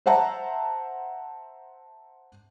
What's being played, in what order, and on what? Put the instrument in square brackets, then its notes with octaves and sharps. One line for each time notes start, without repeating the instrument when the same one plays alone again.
[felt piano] C5 E5 F#5 A5 A#5